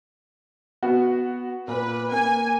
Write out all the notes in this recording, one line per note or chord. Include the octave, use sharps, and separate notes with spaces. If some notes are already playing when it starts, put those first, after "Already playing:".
B3 F#4
A#2 B4
A#3 G#5